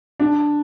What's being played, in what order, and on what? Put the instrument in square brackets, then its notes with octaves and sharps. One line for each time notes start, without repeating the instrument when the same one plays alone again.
[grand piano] D4